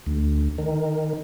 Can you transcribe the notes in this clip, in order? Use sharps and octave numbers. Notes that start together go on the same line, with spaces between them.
D2
D#3